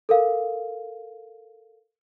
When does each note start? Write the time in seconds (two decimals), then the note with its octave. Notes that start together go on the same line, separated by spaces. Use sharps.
0.09 A4 A#4 F5